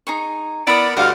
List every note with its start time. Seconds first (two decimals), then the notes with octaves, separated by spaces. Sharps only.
0.07 D#4 G#4 C#6
0.67 B3 E4 A#4 D5 D#6
0.97 D2 G2 F#4 D5 D#5 F5